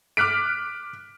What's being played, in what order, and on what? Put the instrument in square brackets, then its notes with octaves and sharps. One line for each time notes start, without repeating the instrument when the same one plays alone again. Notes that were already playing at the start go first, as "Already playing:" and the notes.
[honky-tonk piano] D6 F6 F#6 B6 D7